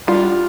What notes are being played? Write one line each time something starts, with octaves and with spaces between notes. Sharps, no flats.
G3 D4 F4